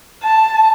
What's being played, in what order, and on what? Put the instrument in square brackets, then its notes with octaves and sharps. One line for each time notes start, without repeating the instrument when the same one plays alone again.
[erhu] A5